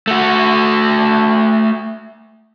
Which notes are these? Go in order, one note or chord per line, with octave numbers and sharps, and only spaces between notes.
A3 F#4